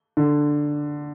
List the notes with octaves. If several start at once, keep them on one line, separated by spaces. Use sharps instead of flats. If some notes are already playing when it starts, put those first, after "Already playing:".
D3